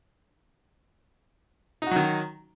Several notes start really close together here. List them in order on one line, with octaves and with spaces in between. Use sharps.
D#4 F#4 F#3 D#3